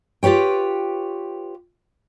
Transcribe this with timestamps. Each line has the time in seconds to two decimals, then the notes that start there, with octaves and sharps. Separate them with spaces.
0.23 F4 G4 B4 C#5 G5